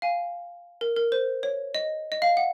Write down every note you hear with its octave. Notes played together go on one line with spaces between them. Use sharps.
F5 G#5
A#4
A#4
C5
C#5
D#5
D#5
F5
F#5